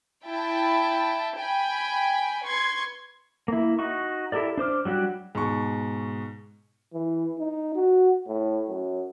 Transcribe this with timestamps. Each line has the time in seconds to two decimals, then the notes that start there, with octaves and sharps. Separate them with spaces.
0.24 E4 G5 A5
1.36 G5 G#5 B5
2.43 B4 C6 C#6 G#6
3.48 A#3 E4
3.79 D#4 F#4 C#6
4.32 E4 G4 A4 A#4 D5
4.58 D4 C5 D6 F6
4.85 F#3 G3 D4 F#4 G4
5.35 G#2 B2 C#6
6.94 E3
7.39 D#4
7.75 F#4
8.27 A2
8.68 F#2